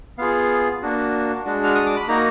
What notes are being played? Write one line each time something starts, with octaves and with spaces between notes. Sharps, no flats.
B3 F4 G#4 F5
A#3 D4 F#4
G#3 D4 F#4
F6
D#6
D6
B5
A#3 D#4 F#4 A#5